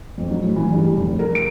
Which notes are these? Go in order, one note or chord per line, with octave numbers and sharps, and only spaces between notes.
F2
F#3
A2
E3
G2
G3
F1
A#4
D7